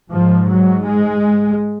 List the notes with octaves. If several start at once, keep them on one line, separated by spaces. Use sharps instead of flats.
G#2 F3
F#3
G#3